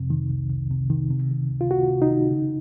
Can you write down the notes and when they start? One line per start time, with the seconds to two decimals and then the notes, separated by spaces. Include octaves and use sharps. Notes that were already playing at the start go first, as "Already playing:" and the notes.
Already playing: F2 C3
0.10 D#3
0.30 C2
0.50 C2
0.71 C3
0.90 D#3
1.11 C3
1.31 D#3
1.51 C#2
1.61 F4
1.71 C#2 F#4
1.91 C3
2.02 D#4
2.11 D#3
2.31 C#3